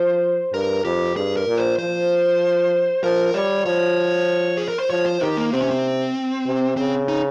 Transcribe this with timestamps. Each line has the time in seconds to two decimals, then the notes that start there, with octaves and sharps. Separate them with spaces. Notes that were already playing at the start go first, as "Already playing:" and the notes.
Already playing: F3 C5
0.53 G2 A#4
0.85 F2 G4
1.16 G2 G#4
1.37 A#4
1.47 A#2
1.58 C5
1.78 F3 C5
3.03 F3 A#4
3.34 G3 C#5
3.66 F3 C#5
4.57 G#4
4.68 A#4
4.79 C5
4.90 F3 C#5
5.06 C5
5.21 D#3 G4
5.37 A#3
5.52 C3 C4
5.61 C#4
5.71 C4
6.46 C3
6.77 C#3 C4
7.08 D#4